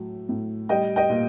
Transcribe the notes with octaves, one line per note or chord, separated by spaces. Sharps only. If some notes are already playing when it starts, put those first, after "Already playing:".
Already playing: A2 F#3
A2
G3 D#5 G5
D#5 G5
A#2